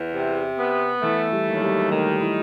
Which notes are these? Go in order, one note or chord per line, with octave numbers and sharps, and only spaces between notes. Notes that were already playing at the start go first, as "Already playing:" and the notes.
Already playing: E2
C3
B3
E3 A3
G3
D#2
F#3
G3
D#3 A3
E4